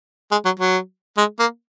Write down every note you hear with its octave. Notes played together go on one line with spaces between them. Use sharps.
G#3
F#3
F#3
G#3
A#3